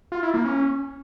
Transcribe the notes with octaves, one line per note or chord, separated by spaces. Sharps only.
F4
E4
A#3
C#4